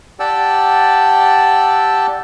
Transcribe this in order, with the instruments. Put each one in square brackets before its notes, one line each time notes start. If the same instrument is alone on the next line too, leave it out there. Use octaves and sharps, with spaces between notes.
[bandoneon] G4 D5 F#5 G5 A5 E6